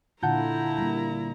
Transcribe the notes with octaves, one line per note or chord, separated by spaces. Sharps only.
A#2 D3 E4 F4 F#5 A5 A#5 G6
G3 A#3